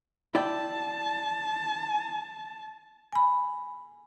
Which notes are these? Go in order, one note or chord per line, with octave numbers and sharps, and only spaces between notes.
E4 D5 G5 A5
G#5 B5